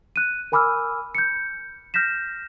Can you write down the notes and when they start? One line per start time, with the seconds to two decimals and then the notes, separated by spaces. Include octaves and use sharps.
0.16 F#6 D#7
0.52 A#4 G#5 B5 D6 E6 F6
1.15 G6 C#7
1.94 F6 G6 A#6 B6 E7